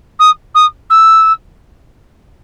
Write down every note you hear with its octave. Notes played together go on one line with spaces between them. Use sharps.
D#6
D#6
E6